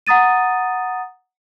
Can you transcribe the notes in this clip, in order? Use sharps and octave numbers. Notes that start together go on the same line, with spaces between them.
F#5 A#5 D#6 A6 D#7